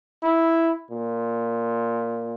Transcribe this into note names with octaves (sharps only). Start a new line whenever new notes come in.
E4
A#2